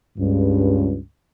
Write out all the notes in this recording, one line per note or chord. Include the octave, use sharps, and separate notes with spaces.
C#2 G2